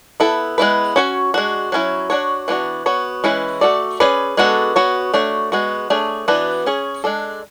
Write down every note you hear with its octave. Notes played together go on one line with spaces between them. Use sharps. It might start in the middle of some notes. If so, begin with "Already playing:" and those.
B3 E4 A4
G#3 B3 E4 B4
C#4 F#4 C#5
G#3 D4 F#4
F#3 C#4 E4
D4 F#4 C#5
E3 B3 D4 F#4
B3 F#4 C#5
E3 G#3 C#4 E4 B4
A3 C#4 F#4 A4 D5
C#4 G#4 B4 D5
G#3 B3 D4 F#4 A4
B3 F#4 C#5
A3 D4 F#4 C#5
G#3 B3 F#4
A3 D4 G#4 C#5
E3 B3 D4 F#4 B4
C#4 G#4 C#5
G#3 D4 A4